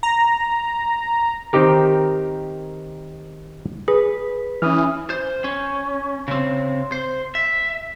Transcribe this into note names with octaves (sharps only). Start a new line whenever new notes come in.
A#5
D#3 C4 D#4 G4 A#4
G#4 B4
E3 C#4 D#6 F6
C5
C#4
C#3 C4
C5
E5